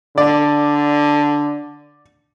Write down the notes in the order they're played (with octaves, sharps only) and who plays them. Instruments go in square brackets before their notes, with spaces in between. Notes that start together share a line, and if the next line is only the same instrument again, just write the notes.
[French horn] D3 [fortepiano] D5